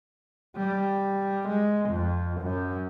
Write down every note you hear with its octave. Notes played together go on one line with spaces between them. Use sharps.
G3
G#3
F2
F#2